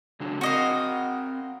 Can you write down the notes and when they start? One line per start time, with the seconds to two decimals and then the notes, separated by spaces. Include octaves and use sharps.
0.20 C#3 F#3 D4
0.41 C4 F#4 A#4 D#5 F5